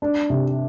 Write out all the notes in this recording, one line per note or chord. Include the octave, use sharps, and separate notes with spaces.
D4
C3